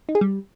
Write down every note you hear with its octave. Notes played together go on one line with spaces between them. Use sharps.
D#4
G#4
G3